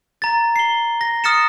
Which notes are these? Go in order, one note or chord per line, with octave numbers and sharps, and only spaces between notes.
A#5 A6
C7 G7
A#6
D#6 F6 A6 A#6 C#7 E7